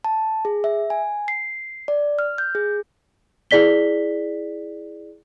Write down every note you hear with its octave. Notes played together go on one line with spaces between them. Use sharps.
A5
G#4
E5
G#5
C7
D5
F6
G6
G#4
E4 G#4 D5 B6 G7